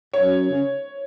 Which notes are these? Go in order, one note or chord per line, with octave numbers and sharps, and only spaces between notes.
F#2 C#5
C#3